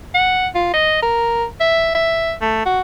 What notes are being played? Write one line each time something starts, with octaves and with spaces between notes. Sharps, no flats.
F#5
F4
D#5
A#4
E5
E5
A3
F#4